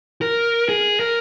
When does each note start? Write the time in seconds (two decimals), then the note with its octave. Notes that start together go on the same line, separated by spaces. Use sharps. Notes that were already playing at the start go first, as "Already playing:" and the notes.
0.21 A#4
0.69 G#4
1.00 A#4